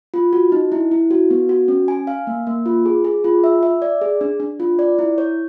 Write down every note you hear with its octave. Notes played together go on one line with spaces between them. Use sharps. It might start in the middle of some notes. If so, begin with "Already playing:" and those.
F4
F#4
D#4
E4
E4
F#4
B3
F#4
C#4
G#5
F5
A#3
A#3
F4
G#4
G#4
F4
E5
E5
D5
G#4
D4
D4
F4
D5
E4
C#5